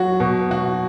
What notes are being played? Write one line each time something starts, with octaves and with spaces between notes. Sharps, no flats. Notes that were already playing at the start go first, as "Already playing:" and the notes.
Already playing: F#3 F#4
B2
F#4